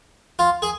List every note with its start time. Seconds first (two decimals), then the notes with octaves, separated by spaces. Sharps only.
0.39 F4
0.62 G#4